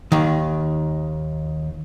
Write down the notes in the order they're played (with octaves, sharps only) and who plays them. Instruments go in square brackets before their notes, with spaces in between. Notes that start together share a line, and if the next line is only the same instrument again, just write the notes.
[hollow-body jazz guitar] D#2 D#3